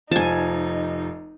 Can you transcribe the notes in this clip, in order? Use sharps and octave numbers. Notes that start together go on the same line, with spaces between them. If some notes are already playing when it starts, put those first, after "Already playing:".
F1 F3 D#4 G#5 A5